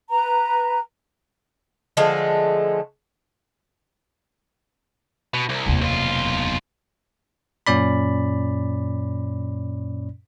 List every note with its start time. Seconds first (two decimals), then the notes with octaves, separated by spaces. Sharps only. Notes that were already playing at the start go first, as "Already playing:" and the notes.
0.10 B4 A#5
1.97 D3 F3 G#3 A3
5.34 B2
5.49 C2
5.66 F1 D#2
5.81 B1 F4
7.67 F#2 A#2 C#4 D5 B5